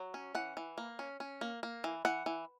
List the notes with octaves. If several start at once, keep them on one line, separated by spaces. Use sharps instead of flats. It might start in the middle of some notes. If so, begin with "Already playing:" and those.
Already playing: F#3
C#4
E3 F#5
E3
A#3
C#4
C#4
A#3
A#3
E3
E3 F#5
E3